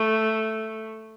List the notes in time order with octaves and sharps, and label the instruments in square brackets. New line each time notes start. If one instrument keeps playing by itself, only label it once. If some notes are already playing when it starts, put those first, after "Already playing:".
Already playing: [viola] A3